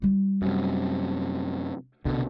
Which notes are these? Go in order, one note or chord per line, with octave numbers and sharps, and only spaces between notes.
G3 F4
F#2 C3
C2 B2 D3